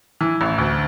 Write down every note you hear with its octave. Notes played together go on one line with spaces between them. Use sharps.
E3
A1
D2